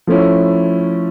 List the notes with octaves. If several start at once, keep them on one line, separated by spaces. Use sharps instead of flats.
F3 A3 C#4 E4